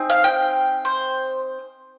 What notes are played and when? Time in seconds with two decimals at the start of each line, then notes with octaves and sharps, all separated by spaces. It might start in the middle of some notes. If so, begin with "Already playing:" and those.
Already playing: C4 D#4 G#4
0.10 F5
0.24 G5
0.85 C5